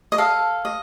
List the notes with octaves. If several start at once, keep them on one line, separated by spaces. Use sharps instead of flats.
D#5
A4 F5
D#5